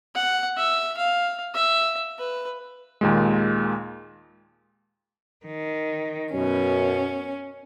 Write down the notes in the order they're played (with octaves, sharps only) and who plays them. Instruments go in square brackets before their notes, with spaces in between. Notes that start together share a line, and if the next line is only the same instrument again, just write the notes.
[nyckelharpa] F#5
E5
F5
E5
B4
[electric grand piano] D#2 A#2 G#3
[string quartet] D#3
[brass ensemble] F#2 B2 [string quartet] C#4